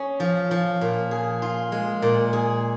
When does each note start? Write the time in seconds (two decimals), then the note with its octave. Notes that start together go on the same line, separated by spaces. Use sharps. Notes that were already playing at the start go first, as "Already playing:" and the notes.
Already playing: C#4 G#4
0.20 F3
0.51 F3
0.81 A#2
1.11 G#4
1.42 F4
1.72 G#3
2.02 A#2
2.33 G#4